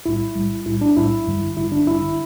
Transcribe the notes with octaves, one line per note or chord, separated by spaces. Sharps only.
B1 A2 G3 E4
B1 A2 G3
B1 A2 G3 E4
D4
B1 A2 G3 E4
A1 G2 D3 G3
A1 G2 D3 G3 E4
D4
A1 G2 D3 G3 E4